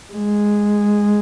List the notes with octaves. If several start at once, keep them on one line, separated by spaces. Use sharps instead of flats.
G#3